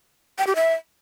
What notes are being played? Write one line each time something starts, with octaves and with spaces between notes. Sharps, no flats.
G5
G4
E5